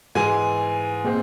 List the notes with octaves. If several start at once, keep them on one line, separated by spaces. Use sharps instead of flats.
G#2 E3 G#3 G#5
A#2 G#3 C4